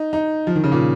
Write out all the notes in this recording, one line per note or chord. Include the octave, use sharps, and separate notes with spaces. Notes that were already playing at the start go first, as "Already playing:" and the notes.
Already playing: D#4
D#4
F3
D#3
C#3
A#2